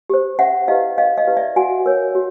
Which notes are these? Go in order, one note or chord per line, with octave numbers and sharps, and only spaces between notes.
G4 C5
C#4 E5 F#5
E4 G4 B4 D#5 F5
C#4 D#5 F5
D#5 F5
E4 G4 B4
D5 E5
F#4 F#5 G#5
A#4 C#5
F#4